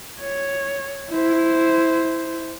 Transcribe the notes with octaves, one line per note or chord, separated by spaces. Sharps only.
C#5
E4 C5